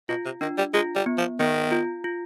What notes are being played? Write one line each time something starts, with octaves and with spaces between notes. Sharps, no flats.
B2 F4
C3
D#3 D4
G3
G#3 F4
G3
B3
F3
D#3 B3
F4
F4